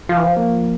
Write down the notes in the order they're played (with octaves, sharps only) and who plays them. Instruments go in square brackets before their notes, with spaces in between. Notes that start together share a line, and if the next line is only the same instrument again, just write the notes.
[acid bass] F3 [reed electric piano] F4
[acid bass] E3
F3
[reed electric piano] A#3